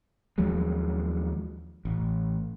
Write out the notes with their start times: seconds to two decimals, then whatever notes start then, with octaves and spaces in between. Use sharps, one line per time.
0.38 D#2 F3 F#3 G#3
1.85 A1